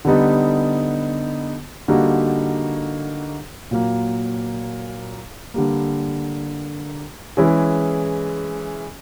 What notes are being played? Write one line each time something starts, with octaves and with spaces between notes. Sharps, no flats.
D3 G3 B3 D#4
D3 G3 A#3 D#4 F#4
A#2 F#3 A#3
D3 G3 A#3
E3 G#3 C#4 E4 G#4